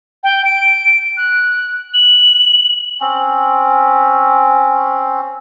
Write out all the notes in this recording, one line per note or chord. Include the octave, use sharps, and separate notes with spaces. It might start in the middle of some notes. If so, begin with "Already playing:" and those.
G5
D7
F#6
F#7
C4 C#4